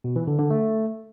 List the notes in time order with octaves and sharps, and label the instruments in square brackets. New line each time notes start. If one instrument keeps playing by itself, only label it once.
[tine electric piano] B2
E3
D3
D3
A3